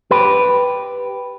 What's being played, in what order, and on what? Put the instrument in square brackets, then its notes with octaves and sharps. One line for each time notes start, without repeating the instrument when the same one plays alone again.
[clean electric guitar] G4 B4